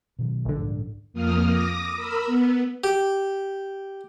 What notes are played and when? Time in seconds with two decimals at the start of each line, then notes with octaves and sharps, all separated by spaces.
0.19 B2 D#3 F#3
0.45 A#1 D3
0.60 C2 G#2
1.13 F2 A#3 D#6 F6
1.46 D6 D#6 A#6
1.96 A#4 B5 E6
2.26 B3
2.84 G4